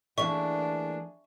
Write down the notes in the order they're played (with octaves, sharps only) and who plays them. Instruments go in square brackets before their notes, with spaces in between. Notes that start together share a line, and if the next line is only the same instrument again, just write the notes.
[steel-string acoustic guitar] E3 A3 A#3 [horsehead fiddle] D4 G#4 [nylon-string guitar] E5 [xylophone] C#6